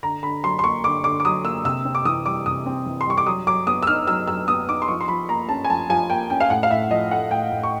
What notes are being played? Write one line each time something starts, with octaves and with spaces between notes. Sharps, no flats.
D3 A#5
D3 B5
F#3 C6
C6
A#3 C#6
D3 D6
D3 D6
D6
F#3 D#6
A#3 E6
C3 E6
C4
D6
E3 D#6
G3 D6
C3 D#6
C4
E3
C6
G3 C#6
D6
F#3 D#6
F#3 D6
B3 D#6
E6
D#4 F6
F#3 E6
F#3 E6
B3 D#6
D#4 D6
C6
F3 C#6
C6
F3 B5
A#3 A#5
C#4 A5
G#5
F3 A5
F3 G#5
A#3 G5
C#4 G5
F5
A2 F#5
F5
A2 E5
F3 D#5
A3 F#5
A2 G5
A2
C#6